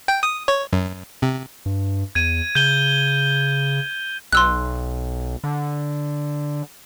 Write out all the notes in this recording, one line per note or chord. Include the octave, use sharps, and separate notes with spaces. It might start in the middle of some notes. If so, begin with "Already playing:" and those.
G5
D#6
C#5
F#2
C3
G2
E2 G#6 D#7
C#3 G6 D#7 G7
B1 C6 E6 F#6
D3